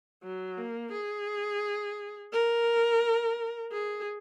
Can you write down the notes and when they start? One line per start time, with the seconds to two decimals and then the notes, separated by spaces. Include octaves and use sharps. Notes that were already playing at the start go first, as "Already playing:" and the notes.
0.23 F#3
0.57 A#3
0.92 G#4
2.32 A#4
3.72 G#4